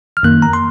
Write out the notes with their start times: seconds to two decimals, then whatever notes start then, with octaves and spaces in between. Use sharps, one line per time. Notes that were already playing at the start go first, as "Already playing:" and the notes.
0.17 F6
0.23 F#2 D#3 A#3 F#6
0.42 A#5
0.53 C6